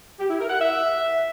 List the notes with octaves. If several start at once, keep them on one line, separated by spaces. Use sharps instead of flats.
G4
E4
A#4
F#5
E5